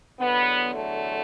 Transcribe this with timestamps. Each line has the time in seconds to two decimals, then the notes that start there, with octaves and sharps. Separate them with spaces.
0.20 E2 D3 F#3 B3
0.75 A3